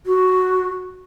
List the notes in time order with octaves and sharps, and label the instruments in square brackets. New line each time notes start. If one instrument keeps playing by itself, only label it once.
[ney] F#4